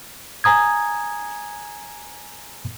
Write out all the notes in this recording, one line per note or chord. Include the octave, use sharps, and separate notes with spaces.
G#5 A#5 D#6 G#6